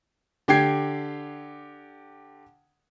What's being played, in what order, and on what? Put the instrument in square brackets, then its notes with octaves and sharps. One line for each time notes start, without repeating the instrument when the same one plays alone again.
[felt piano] D3 G4 G5 G#6 C7